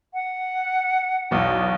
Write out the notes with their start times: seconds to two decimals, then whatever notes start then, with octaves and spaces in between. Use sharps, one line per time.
0.13 F#5
1.31 B1 E2 B2